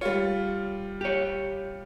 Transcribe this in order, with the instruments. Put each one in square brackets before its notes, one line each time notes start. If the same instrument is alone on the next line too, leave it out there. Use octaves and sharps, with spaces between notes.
[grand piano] G3 F4 [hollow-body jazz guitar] C#5
[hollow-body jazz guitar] G4 C#5